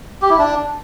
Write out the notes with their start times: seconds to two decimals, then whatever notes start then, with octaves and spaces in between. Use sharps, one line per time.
0.22 G4
0.30 E4
0.38 D4